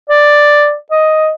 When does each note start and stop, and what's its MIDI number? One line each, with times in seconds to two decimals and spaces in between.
0.10 0.74 74
0.91 1.29 75